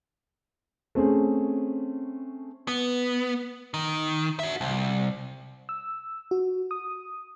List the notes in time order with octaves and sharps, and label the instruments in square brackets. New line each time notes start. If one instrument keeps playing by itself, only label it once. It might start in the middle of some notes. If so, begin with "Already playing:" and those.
[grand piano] A3 C4 C#4 G#4
[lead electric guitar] B3
D#3
F#4 E5
C2
[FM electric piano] E6
F#4
D#6